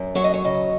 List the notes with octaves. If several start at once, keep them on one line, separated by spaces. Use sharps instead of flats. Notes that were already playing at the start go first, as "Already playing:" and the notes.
Already playing: F#2
F#3 C#5
D#5
C#5
C#3 D#5